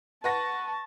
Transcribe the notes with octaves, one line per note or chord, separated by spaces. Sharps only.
B4 F#5 A5 C#6 A#6